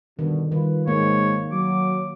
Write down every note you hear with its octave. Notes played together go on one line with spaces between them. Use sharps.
G2 B2 D3 D#3
D#3 G3 F4 B4
G#2 A#3 C#5
F#3 D6